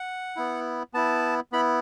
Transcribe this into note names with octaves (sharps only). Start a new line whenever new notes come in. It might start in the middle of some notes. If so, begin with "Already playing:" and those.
Already playing: F#5
B3 E4
B3 E4 A5
B3 E4 B5